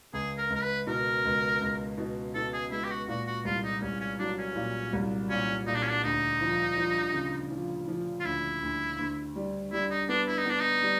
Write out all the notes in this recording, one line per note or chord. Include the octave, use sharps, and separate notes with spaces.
C#2 G#4
A#4
C#2 A#4
B4
B2 A#4
C#2
C#2
B2
B2 A4
G#4
G#3 E4
G4
F#4
A#2 F#4
F#4
C2 F4
D#4
C2 C#4
C#4
F#3 D4
C#4
A#2
C2
A#2 C#4
A#2 D#4
D4
C#4
D4
D2 D#4
F3
F3
C#3
F3
F3
F4
D2 E4
D2
D2
G3
G3 E4
D#4
B3 D4
E4
D#4
B3 D4
D#4
G3